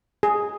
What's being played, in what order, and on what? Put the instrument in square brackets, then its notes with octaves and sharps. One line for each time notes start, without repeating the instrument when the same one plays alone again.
[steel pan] G#4